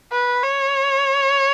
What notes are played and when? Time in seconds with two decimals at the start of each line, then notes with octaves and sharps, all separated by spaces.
0.12 B4
0.43 C#5